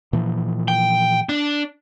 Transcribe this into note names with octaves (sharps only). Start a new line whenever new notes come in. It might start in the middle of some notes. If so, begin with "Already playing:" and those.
A#2 E3 F3
G5
D4